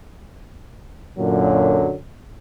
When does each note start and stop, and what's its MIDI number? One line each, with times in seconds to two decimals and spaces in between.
1.17 1.95 42
1.17 1.95 46
1.17 1.95 50
1.17 1.95 54